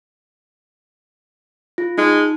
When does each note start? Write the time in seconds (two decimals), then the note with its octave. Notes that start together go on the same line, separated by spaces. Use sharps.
1.78 F4
1.98 G#3 D#4